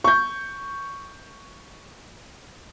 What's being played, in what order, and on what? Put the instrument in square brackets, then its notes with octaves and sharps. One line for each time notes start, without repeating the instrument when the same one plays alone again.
[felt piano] C#6 G6